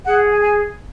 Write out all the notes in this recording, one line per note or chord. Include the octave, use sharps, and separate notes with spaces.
G#4 F#5
G#5
G#5